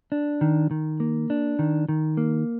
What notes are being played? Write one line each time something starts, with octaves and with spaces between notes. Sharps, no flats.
D4
D#3
D#3
A#3
D4
D#3
D#3
A#3